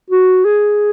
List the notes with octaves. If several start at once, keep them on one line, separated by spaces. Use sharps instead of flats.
F#4
G#4